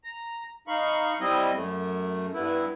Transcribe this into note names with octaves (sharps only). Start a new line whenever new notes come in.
A#5
D#4 F5 B5 C#6
G3 C4 E4 D#5
F#2 A3
G2 B3 E4